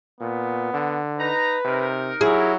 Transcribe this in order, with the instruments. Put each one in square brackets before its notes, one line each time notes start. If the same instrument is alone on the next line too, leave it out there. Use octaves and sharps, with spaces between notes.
[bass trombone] A#2 [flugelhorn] B3
[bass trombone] D3
[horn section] D#4 A#5 [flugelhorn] B4
[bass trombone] C3 [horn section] D#4 A#4
[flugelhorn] F#3 [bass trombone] E4 [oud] G#4